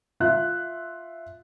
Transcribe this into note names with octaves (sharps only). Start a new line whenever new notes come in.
F4 E5 F#6